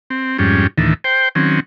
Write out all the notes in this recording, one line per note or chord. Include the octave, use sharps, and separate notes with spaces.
C4
F2 G#2 G3 C#4
D2 A2 D#3 E3
C5 G5
D#3 F#3 C4 C#4